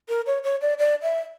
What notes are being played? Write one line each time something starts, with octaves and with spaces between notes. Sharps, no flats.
A#4
C#5
C#5
D5
D5
E5